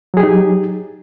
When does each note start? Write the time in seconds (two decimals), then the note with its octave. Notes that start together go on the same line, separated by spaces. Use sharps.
0.14 F#3
0.17 G#4
0.20 G4
0.23 D#4